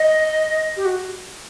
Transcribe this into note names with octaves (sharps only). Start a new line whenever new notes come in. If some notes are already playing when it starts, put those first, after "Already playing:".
Already playing: D#5
G4
F#4